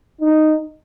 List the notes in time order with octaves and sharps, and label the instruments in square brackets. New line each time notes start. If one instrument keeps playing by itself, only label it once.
[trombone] D#4